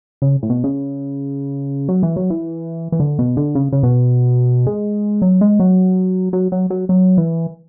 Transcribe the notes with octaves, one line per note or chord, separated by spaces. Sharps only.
C#3
A2
B2
C#3
F#3
E3
F#3
E3
E3
D3
B2
D3
C#3
C#3
B2
G#3
F#3
G#3
F#3
F#3
F#3
F#3
F#3
E3